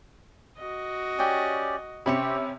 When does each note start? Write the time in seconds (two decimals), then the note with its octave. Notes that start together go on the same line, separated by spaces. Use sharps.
0.57 F#4 D#5
1.19 C#4 G4 D5 G5 G#5
2.06 C3 C4 C#4 G4 C#5 E5 B5